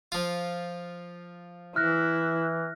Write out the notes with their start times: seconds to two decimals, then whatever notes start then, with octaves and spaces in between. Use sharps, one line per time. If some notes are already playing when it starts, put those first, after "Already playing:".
0.12 F3 F4
1.76 E3 E4 F6 F#6 A#6